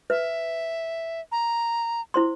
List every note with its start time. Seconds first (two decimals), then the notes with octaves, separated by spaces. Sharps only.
0.10 B4 E5
1.32 A#5
2.14 E4 C5 C6